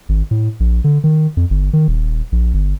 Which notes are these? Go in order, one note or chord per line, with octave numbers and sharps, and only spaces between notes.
G#1
A2
A#1
D3
D#3
F2
G1
D#3
D#1
A#1
G1